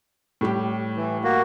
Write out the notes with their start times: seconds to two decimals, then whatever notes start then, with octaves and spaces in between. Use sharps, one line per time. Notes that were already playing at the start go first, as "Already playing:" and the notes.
0.41 A2 G3 G4
0.96 E3
1.24 A#3 F#4